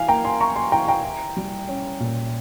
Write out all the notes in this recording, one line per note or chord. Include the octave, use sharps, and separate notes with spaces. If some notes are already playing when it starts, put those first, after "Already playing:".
Already playing: E3 F5 G#5
A#3 G5 A#5
G#5 C6
E4 A#5 C#6
G#5 C6
E3 G5 A#5
G5 A#5
E4
G3
C#4
A#2